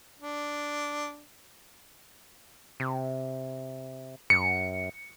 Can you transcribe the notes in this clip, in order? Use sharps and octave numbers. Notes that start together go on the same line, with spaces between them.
D4
C3
F#2 C#7